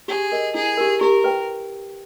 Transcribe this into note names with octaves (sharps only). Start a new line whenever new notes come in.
G4 G#4
A#4 D#5
E4 G#4
G4 A#4
G4 A#4
B4 G5